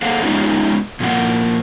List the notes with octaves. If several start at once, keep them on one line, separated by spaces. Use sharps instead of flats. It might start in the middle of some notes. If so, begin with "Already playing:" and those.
A#3 G#4 A4 C5 F5 F#5
G#3 B3 C#4 D#4 F4 G4
A#2 F3 A#3 F#5